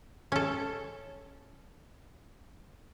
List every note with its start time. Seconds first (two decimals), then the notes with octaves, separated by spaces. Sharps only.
0.32 C#4 A4